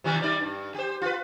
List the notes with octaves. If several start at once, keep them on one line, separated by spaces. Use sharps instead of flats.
C3 D#3 G3
G3 D#4 D5
G2
G4 C5
F4 B4